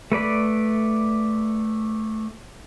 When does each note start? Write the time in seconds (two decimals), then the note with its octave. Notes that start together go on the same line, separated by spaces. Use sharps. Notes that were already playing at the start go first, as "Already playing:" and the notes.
0.12 A3 B4 D5 B5